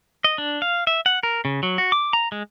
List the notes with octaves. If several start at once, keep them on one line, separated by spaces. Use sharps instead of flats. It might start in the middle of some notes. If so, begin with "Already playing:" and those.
D#5
D4
F5
E5
F#5
A#4
C#3
F#3
F#4
D6
A#5
G#3